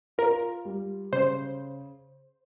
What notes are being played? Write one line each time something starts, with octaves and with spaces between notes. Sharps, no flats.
F4 A#4
G3
C#3 C5